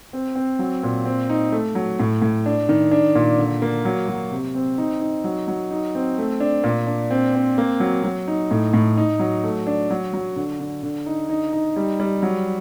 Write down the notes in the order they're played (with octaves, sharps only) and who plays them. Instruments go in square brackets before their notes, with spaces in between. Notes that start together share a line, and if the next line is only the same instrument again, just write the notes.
[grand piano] C4
C4
F#3
A#2
C4
D#4
A3
F#3
A2
A2
D4
D#3
D4
A#2
D3
A#3
F#3
F#3
C3
C4
D#4
D#4
F#3
F#3
D#4
C4
A3
D4
A#2
D4
C4
C4
A#3
F#3
F#3
D#4
A2
A2
D#4
F#3
A3
D4
F#3
F#3
D3
D3
D3
D#4
D#4
D#4
G3
G3
F#3